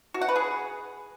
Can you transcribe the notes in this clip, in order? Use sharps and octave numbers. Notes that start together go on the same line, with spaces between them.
F#4
F#5
B4
G#4